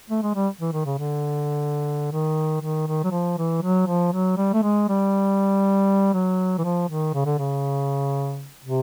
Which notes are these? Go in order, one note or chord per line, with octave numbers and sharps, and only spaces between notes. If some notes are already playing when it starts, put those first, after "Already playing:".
A3
G#3
G3
E3
D#3
C#3
D3
D#3
D#3
D#3
F#3
F3
E3
F#3
F3
F#3
G3
A3
G#3
G3
F#3
E3
F3
D#3
C#3
D3
C#3
C3